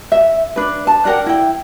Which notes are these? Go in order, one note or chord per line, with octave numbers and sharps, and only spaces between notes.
E5
D4 B4
A5
D4 A#4 F#5 G5
E4 G5